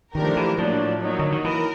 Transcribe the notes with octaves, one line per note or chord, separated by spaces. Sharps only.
D#3 F3 A3 D4 G4 A#4
E3
A2 F3 F#3 A#3 D4
F#3 A#3 D#4
D3
D#3
E3 A#4